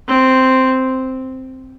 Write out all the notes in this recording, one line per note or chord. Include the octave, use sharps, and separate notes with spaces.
C4